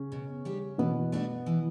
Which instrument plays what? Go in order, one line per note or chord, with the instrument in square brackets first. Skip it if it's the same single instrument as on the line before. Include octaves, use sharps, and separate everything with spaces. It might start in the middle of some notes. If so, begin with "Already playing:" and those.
Already playing: [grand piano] C#3 C#4
[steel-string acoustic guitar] B2
G3 D4 G4
[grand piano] B2 B3 [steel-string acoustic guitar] E3
[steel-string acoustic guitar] A3 D4 F#4
E3